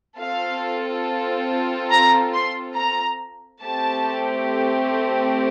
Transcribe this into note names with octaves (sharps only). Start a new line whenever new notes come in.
C4 F4 A4 F5
A#5
C6
A#5
A3 C4 G4 A5